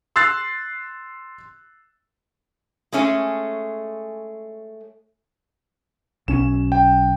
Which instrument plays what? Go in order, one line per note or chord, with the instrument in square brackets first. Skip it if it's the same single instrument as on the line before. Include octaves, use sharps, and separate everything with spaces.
[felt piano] C6 E6 F#6 A6 C7
[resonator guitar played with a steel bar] G#3 A3 C#4 G#4
[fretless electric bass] B1 C#4 [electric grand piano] E7
[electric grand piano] G5